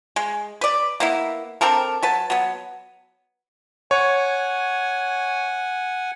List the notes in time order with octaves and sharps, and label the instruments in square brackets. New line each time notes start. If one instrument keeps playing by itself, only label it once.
[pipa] G#3
B4 D5
A#3 B3 E4
C4 D4 A4 A#4
F#3 B4 A5
F#3 B3
[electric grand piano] C#5 [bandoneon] F#5 G#5